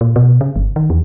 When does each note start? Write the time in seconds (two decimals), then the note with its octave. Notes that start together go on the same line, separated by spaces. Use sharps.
0.01 A#2
0.16 B2
0.41 C#3
0.56 G1
0.76 D#3
0.90 E2